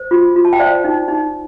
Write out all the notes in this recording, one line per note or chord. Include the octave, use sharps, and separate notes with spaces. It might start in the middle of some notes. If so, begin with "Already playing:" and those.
Already playing: C5
F4
F4
A5
G5
C5 D5 F5
D#4
D#4